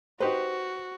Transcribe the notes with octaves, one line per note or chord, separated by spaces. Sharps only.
D#4 F#4 G4 B4 C5